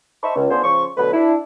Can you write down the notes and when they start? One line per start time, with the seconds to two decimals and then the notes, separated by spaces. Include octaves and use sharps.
0.23 C5 D#5 E5 A5 B5 C#6
0.36 C#2
0.51 B3 D4 F4 G#4 C5
0.64 C#3 F3 C5 C#6
0.97 B2 D3 F#3 A3 B4
1.14 D4 E4